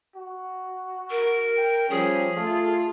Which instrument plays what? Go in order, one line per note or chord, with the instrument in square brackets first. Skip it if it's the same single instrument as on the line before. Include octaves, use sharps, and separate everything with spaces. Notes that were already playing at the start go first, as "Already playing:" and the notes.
[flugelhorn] F#4
[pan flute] A#4
[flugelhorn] G5
[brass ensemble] F3 G3 C#4 [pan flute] G#4
[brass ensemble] A3 F4 [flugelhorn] A4